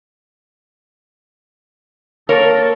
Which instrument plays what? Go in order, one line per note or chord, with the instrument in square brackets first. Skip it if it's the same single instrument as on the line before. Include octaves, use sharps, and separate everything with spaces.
[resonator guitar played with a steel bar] A#3 A#4 C#5 [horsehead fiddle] A4